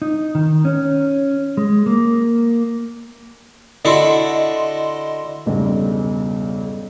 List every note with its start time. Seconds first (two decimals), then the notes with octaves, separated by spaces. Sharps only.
0.02 D#4
0.35 D#3
0.65 C#4
1.57 G#3
1.86 A#3
3.85 D3 E4 F#4 D#5 C6
5.46 B1 E2 G2 C#3